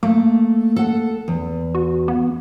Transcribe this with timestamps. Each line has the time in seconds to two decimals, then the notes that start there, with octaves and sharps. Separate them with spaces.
0.03 A3 A#3
0.76 A4 F#5
1.28 E2
1.75 F#4
2.08 B3